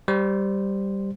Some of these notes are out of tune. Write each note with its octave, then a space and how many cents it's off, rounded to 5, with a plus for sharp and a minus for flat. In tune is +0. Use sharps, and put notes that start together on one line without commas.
G3 +0 C5 -5